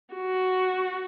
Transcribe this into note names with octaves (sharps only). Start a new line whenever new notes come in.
F#4